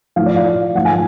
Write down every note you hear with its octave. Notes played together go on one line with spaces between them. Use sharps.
A2 F3 F5
D5
F5
G#2 F3 F#5
G#5